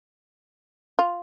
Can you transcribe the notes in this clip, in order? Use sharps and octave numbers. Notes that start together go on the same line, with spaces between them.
F4